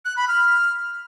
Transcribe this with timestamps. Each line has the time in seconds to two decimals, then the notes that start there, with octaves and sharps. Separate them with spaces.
0.05 F#6
0.17 B5
0.28 F6